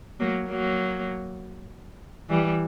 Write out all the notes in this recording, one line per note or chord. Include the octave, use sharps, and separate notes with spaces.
F#3 A#3
F#3 A#3
E3 G3